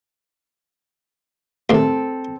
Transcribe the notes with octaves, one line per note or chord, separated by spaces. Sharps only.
D#2 A2 C4 A4